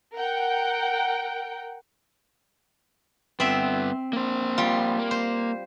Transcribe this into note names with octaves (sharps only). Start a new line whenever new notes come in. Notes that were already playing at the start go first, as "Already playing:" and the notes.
A#4 F#5 G5
G2 B3 C4 E5
A#3 C5
G3 F4
A#3
C5